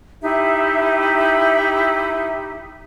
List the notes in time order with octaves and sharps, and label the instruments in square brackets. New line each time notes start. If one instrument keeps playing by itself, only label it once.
[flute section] D#4 E4 G4 E5